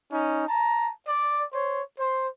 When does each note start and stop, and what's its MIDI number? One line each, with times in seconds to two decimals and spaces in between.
0.10 0.43 61
0.10 0.43 63
0.46 0.89 81
0.46 0.89 82
1.07 1.44 74
1.52 1.80 72
1.52 1.80 73
1.97 2.26 72